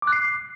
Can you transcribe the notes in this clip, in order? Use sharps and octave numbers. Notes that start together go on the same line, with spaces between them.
D6
F#6
C7